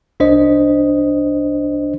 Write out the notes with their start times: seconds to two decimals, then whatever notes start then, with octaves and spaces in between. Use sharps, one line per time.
0.20 C2 D4 C5 D#5